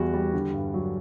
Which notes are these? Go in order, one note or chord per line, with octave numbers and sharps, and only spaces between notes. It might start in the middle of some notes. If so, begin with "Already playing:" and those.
Already playing: E2 E3 G3 F#4
G3
D3
G2
F#3